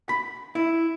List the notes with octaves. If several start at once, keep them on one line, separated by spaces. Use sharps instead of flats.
B5
E4